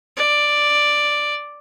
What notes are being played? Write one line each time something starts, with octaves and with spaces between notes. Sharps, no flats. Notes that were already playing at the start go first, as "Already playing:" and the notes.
D5